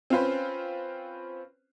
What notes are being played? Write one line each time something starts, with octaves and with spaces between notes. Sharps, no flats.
C4 C#4 F4 B4 C5